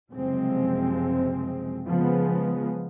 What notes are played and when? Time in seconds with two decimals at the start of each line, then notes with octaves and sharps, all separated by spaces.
0.12 F#1 C3 F3 G#3 C4
1.87 C#3 F3 G#3 B3